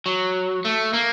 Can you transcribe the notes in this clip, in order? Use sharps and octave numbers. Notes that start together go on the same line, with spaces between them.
F#3
A3
A#3